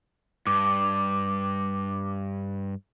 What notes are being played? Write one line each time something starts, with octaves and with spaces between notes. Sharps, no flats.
G2 D6